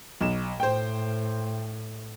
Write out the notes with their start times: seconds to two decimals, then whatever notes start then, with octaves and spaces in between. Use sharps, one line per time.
0.21 B1 E7
0.60 A2 C5 G5